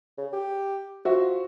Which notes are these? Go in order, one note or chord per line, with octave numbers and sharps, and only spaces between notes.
C#3
G4
F3 F#4 E5